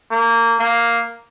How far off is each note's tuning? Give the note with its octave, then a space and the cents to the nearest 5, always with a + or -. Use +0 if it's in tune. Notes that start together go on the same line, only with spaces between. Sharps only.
A#3 -20
A#3 +0